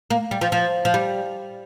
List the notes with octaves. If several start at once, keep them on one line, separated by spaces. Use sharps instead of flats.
A#3
G3
F3
F3
F3
G3